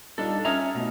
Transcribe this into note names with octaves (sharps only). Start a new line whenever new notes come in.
G3 D4 D#4 F4 A4
C#4 C#5 E5 A#5 D#6 F6
B2 A3 D#4